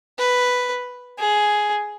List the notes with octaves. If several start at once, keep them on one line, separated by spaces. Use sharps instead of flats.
B4
G#4